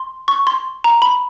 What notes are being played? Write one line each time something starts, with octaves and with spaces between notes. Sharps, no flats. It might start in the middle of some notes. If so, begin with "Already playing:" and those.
Already playing: C6
C#6
C6
A#5
B5